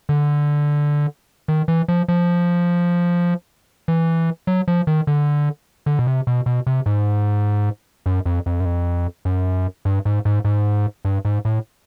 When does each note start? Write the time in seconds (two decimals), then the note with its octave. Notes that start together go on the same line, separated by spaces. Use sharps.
0.09 D3
1.48 D#3
1.68 E3
1.88 F3
2.08 F3
3.88 E3
4.47 F#3
4.68 F3
4.87 D#3
5.07 D3
5.86 D3
5.99 B2
6.07 C3
6.27 B2
6.46 B2
6.67 C3
6.86 G#2
8.06 F#2
8.26 F2
8.46 F2
8.60 F#2
8.65 F2
9.25 F#2
9.85 G2
10.05 G#2
10.25 G#2
10.45 G#2
11.05 G2
11.25 G#2
11.45 A2